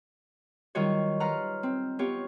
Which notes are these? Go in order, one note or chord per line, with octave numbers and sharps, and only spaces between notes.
D#3 F#3 G3 F4 F#4 C#5
F4 B4 F#5 A#5 F6
C4
B3 F4 G4 C#5